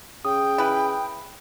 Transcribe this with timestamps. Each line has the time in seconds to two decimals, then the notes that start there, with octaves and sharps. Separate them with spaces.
0.25 C#3 G5 D#6
0.58 E3 B4